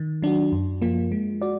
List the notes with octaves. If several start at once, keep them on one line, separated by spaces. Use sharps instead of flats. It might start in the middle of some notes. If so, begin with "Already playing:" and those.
Already playing: D#3
F#3 D4 F#4
F#2
F3 A#3 F4
G#3
F#4 D5